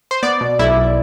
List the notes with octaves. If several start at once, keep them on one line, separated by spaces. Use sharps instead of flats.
C5
B3 D5
B2
B1 E4
B1